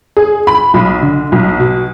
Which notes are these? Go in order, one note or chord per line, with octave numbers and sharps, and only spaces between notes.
G#4
B5
B1
D3
B1
B2